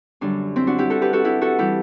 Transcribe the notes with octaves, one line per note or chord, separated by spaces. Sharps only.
F#2 D3 G3 D4
C4 E4
D4 F#4
E4 G4
F#4 A4
G4 B4
F#4 A4
E4 G4
F#4 A4
E3 G3 E4 G4